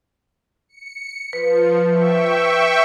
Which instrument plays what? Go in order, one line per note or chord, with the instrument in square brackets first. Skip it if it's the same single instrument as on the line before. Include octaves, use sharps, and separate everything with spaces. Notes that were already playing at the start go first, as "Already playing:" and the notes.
[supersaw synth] C#7
[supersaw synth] F3 [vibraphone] B4
[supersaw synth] E5 G5 C#6